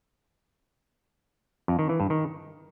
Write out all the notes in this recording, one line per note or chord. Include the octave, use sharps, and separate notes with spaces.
F2
D#3
E3
G2
D#3